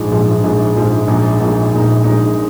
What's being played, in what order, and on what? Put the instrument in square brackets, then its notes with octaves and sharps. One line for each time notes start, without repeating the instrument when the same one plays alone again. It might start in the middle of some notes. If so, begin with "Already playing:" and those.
Already playing: [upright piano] A#1 G#2 F3 G#3
A#1 G#2 F3 G#3
A#1 G#2 F3 G#3
A#1 G#2 F3 G#3
A#1 A#2 G#3 D#4
A#1 A#2 G#3 D#4
A#1 A#2 G#3 D#4
A#1 A#2 G#3 D#4